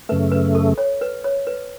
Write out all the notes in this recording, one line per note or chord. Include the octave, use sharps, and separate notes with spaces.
F#2 C#3 A3 B4
B4
A4
C#5
B4
C#5
B4